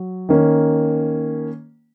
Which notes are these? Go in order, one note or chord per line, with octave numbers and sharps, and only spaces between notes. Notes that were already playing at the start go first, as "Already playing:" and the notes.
Already playing: F#3
D#3 A#3 C#4